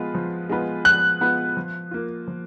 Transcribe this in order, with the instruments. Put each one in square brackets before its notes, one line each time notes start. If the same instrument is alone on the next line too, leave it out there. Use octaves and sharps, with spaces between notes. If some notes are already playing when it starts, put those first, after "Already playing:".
Already playing: [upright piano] F3 G#3 B3 F4 B4
F3
G#3 B3 F4 B4
[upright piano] F3 [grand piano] F#6
[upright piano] G#3 B3 F4 B4
F3
A#3 F4
F3